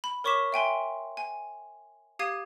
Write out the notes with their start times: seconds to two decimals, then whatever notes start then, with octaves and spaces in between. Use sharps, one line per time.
0.04 B5
0.24 A#4 C#5 C#6 D6 B6 E7
0.52 E5 G5 G#5 C6
1.17 G#5
2.19 G4 F5 D#6 G#6 C7 D#7